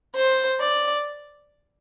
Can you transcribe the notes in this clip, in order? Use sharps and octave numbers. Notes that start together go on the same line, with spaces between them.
C5
D5